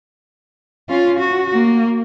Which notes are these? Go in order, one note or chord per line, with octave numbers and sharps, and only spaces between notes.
C#4 F4
F#4
A#3